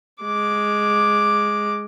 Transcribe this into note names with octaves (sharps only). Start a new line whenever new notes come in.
G#3 D6